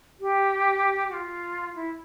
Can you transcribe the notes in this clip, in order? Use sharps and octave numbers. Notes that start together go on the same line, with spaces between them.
G4
F#4
F4
E4